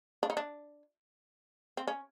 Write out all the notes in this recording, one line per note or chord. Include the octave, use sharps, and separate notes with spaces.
D4
D#4
D4
C4
C#4